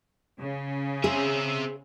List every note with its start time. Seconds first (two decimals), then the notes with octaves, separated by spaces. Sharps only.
0.36 C#3
1.04 C4 G#4 E5